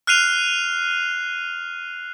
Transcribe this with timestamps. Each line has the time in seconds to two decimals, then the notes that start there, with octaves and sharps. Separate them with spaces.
0.07 F6 F#6 C7 D#7 F7